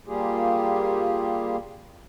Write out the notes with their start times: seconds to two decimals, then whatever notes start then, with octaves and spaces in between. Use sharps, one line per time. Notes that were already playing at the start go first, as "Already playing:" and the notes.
0.07 G3 A#3 F4 G4 G#4